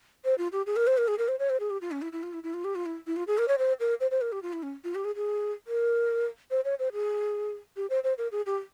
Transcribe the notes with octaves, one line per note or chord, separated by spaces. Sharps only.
C5
F4
G4
G#4
A#4
C5
A#4
G#4
A#4
C5
C#5
C5
G#4
G4
F4
C#4
E4
E4
F4
E4
E4
F4
G4
F4
E4
E4
F4
G#4
A#4
C#5
C5
A#4
C5
C5
A#4
G4
F4
E4
C#4
F4
G4
G#4
G#4
A#4
C5
C#5
C5
G#4
G4
C5
C5
A#4
G#4
G4